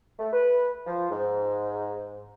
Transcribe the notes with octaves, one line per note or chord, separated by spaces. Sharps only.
A3
B4
F3
G#2